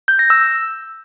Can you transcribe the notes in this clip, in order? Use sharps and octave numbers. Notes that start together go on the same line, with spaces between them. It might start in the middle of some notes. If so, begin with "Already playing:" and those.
G6
A#6
E6